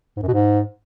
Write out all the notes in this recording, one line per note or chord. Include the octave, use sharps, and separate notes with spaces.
G#2
F#2
B2
G#2